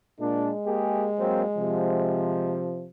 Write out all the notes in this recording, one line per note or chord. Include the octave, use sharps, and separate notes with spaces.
A#2 G#3 D4
A#3 G4 G#4
F#3 A#3 C4
C3 F3